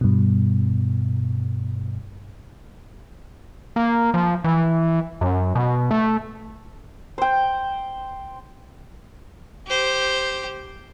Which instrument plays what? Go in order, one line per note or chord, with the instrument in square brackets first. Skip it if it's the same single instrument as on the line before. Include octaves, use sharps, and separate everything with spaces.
[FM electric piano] G2 B2
[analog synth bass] A#3
F3
E3
F#2
B2
A3
[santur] C5 G5
[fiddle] G4 C5